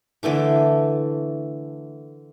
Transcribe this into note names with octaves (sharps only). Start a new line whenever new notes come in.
D3 E3 A3 D6